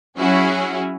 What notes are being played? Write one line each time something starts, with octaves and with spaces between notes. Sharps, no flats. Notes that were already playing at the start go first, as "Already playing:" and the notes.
F#3 C#4 E4 F#4 G#4